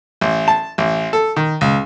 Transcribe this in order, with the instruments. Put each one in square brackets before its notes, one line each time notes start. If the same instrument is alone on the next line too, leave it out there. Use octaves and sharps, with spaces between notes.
[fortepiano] A1
A5
A1
A4
D#3
C#2